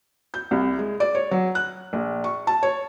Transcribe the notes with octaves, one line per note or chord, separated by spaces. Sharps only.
G6
C2
G#3
D5
C#5
F#3
F#6
A#1
C#6
A5
C#5